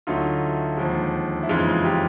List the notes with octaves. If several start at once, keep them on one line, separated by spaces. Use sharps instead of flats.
D2 D3 F#3 A3 D#4 F4
D#2 D3 F3 G#3
E4
F#1 F2 C#3 E3 G#3 D#4 F4
F4 G4